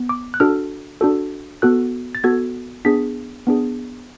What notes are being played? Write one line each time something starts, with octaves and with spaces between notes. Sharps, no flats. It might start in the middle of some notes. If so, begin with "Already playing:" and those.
Already playing: B3
D6
F#6
D4 F#4 A4 F6
D4 F#4 A4
B3 F#4 A4 F#6
A6
B3 F#4 A4 G#6
B3 D4 G#4 B6
B3 D4 G#4